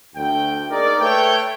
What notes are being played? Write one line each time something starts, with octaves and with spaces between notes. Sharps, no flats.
D2 G5
A#3 D#4 G#4 A#4 D5
A3 B4 C#5 G5